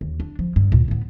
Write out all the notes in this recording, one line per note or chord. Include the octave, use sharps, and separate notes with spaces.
D#2
D4
F3
G2
D2 A#2
A2 B3